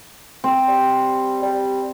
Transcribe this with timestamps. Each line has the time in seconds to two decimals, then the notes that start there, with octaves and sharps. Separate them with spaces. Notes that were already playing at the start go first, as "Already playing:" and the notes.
0.44 C4
0.68 G3
1.42 G3